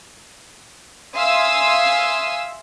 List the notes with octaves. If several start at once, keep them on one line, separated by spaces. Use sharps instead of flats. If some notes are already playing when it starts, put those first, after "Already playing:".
E5 F5 G#5 C6 D#6 E6